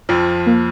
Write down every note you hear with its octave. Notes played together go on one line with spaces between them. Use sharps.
F2 F3
A#3